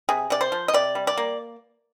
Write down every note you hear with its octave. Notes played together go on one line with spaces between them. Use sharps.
C3 G#4
C3 D5
C5
F3
D#5
C3 D5
G3
D5
A#3